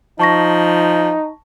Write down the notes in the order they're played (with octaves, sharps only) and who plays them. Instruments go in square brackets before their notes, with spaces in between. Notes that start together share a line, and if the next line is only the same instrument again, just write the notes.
[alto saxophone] F3 [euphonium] D#4 [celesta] A5 C#6 A#6